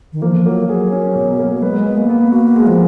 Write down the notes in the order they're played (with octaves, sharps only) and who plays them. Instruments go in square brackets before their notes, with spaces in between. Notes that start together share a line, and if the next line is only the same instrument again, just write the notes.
[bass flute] D#3
[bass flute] F3 [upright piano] A#3
[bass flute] F#3 [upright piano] A#3
[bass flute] F#3 [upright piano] G#4
[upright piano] C#4
B2
A#3
[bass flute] G#3 [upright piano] B4
[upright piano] B3
[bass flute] A#3
[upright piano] B3
[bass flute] A#3 [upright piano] F#4
[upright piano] G#3
[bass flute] F3